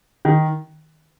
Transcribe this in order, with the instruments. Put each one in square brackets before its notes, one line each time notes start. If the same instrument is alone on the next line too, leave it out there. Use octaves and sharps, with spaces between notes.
[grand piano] D#3